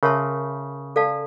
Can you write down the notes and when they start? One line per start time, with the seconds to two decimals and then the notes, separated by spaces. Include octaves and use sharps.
0.03 C#3 A#4 C#5 E5 A5 C6
0.96 A4 D5 F5 A5